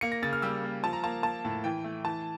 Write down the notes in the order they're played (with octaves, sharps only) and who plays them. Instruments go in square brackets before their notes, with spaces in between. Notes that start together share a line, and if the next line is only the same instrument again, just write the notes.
[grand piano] A#3 C#7
A#6
C#3 A6
F6
G3 E6
A#3
F3 A5
A#5
A#3 A5
A#3 A5
A2
E3 G5
A3
E3 A5